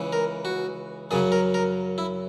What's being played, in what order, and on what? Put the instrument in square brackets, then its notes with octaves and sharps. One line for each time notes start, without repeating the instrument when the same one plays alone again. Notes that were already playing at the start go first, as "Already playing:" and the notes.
Already playing: [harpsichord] C#2 C#3 E3
A#4
F#4
F#2 C#3 F#3 G#4
A#4
A#4
E4